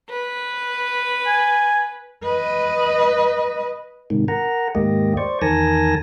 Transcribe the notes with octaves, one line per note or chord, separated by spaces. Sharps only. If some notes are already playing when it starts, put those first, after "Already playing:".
B4
G#5
B4 D#5
G#2 C3 D#3
A#4 F#5 A#5
D#2 G#2 A#3 G4 D#5
C5 D5 C#6
E2 D#3 A#4 G#5 A5 A#6